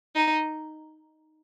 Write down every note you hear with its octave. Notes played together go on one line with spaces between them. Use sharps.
D#4